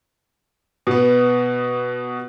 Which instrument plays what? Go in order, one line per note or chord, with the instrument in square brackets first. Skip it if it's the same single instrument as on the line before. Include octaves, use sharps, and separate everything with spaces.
[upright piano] B2 B3